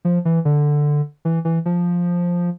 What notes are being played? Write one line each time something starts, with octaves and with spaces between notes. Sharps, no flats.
F3
E3
D3
E3
E3
F3